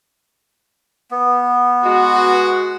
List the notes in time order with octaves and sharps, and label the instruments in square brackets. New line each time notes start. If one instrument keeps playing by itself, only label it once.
[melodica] B3
[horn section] G#3 F#4